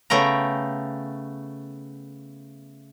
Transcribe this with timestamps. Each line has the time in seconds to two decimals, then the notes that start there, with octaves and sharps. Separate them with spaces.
0.10 C#3 A3 B3 G5 A#5